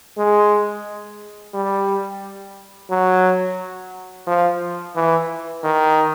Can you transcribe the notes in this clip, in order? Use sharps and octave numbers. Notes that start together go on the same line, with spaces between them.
G#3
G3
F#3
F3
E3
D#3